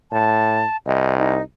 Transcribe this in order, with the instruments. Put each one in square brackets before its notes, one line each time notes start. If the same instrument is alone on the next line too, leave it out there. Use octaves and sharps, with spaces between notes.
[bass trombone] A2 [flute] A5
[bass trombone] C2 [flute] D#5
[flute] D#4